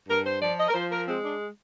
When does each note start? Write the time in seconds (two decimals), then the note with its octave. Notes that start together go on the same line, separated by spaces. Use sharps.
0.08 G2 A#4
0.24 C5
0.41 F3 D5
0.58 D#5
0.69 A#4
0.74 F3 C5
0.91 A#4
1.07 G#3 C4
1.23 D4